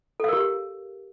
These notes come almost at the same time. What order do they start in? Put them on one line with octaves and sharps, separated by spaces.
A4 F5 A#4 G4